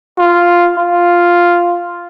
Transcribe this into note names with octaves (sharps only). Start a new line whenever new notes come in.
F4
F4